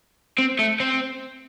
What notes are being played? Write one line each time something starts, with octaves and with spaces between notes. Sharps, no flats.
C4
A3
C4